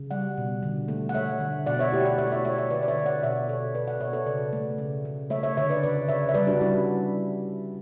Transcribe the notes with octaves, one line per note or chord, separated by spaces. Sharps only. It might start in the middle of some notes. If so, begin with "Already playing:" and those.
Already playing: C#3
G3 D5 F#5
B2
D3
A3
F#5
A3 C#5 E5
D3
B2 D5 F#5
C#5 E5
A3 E4 G4
D5 F#5
A3 C#5 E5
D5
C#5 E5
A3 C#5 E5
C#5 E5
D3 B4 D5
D5
C#5 E5
D3
D5 F#5
B2 C#5 E5
B2 A4 C#5
B2 B4 D5
D5 F#5
B2 C#5 E5
A4 C#5
C#3 B4 D5
A3
C#3
C#3
A3 C#5 E5
C#5 E5
D3 C#5 E5
B4 D5
C#3 B4 D5
C#3 C#5 E5
E5
G3 B4 D5
D4 F#4
G3 C#4 E4